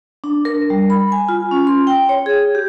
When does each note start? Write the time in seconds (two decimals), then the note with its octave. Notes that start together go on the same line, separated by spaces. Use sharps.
0.24 D4
0.45 A#4
0.70 G3
0.90 B5
1.12 G#5
1.29 F4
1.51 C#4
1.67 C6
1.87 G5
2.09 C#5
2.26 G#4
2.55 G4